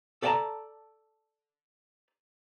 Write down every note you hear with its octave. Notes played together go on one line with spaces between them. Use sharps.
A4 D5 F5 G5 A5 A#5